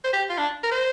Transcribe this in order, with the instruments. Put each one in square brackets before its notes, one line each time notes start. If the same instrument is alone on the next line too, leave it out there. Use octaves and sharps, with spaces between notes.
[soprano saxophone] C5
G4
F4
D4
A#4
C5